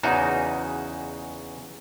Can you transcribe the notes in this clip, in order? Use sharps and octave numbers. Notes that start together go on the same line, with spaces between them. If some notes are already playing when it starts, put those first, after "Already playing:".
E2 C#3 D#4 F#4